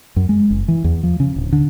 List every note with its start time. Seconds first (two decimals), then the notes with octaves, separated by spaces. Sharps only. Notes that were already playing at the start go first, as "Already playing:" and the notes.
0.16 F#2
0.29 G#3
0.50 F#1
0.68 E3
0.84 E2
1.03 F3
1.20 C#3
1.36 D1
1.52 D3